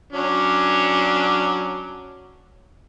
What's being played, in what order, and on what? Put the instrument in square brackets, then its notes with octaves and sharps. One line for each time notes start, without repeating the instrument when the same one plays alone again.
[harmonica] F#3 C#4 D4